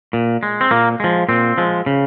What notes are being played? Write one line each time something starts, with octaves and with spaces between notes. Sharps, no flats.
A#2
G#3
C4
A#2 A#3
F3 G#3
A#2 C4
F3 G#3
C#3